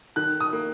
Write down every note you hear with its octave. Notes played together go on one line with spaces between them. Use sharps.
D#3 F#6
D#6
A#3